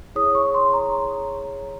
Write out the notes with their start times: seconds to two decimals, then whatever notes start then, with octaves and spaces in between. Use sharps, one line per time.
0.16 E4 G#4 C#5 D#6
0.35 C#6
0.54 C6
0.73 A#5